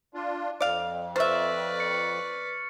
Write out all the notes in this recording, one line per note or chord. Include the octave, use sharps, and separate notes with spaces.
D4 F4
F2 D5 F5
B4 C5 D5 E5 C#6 F6 A6
C#7